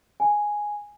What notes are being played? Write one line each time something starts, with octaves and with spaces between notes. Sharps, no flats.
G#5